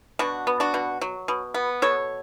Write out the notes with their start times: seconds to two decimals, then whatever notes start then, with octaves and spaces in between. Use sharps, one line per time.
0.19 B2 D4 F#4
0.47 B3
0.60 D4 F#4
0.74 B2
1.01 F#3
1.28 B2
1.54 B3
1.82 B2 A4 C#5